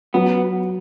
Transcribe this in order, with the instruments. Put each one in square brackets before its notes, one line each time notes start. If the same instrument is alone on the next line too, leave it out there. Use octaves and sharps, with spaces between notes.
[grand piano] F#3 [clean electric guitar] B3